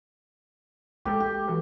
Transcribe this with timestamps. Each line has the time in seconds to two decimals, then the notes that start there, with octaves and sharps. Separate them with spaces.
1.05 A#1 G#3 G4 A4
1.20 G4
1.48 E3 F#4 A4